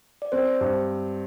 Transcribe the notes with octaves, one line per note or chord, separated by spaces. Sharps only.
D5
C4 C5
G2